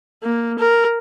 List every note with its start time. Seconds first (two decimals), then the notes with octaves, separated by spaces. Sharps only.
0.23 A#3
0.59 A#4